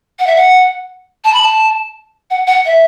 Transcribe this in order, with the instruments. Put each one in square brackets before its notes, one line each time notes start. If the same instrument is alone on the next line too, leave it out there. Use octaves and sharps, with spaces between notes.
[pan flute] F#5
E5
F#5
A5
B5
A5
F#5
F#5
E5